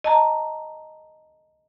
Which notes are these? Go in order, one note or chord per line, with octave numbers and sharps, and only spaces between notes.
D#5 A5 A#5